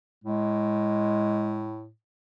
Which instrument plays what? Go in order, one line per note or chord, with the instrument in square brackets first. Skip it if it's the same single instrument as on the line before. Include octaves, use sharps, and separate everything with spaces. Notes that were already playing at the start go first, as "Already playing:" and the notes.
[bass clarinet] A2 [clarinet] G#3